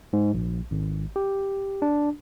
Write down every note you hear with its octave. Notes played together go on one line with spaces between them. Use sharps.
G#2
A#1
G#1
G4
D4